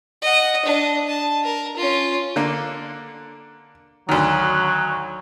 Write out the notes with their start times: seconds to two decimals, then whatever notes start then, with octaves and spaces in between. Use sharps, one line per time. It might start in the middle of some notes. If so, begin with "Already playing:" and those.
0.22 D#5 F#5
0.66 D4 D#5
1.07 A5
1.44 A#4
1.77 C#4 F4
2.36 D3 A#3
4.09 D2 D#3 F#3